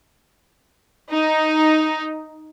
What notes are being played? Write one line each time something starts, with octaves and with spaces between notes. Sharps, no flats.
D#4